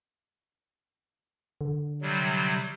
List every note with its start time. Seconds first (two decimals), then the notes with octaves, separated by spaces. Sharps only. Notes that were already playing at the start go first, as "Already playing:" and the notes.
1.61 D3
2.02 C3 F#3 G3